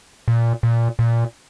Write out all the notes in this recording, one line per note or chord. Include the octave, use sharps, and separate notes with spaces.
A#2
A#2
A#2